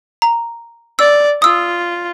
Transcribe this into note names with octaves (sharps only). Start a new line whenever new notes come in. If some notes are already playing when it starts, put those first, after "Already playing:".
A#5
D5 E6
F4 D#6 E6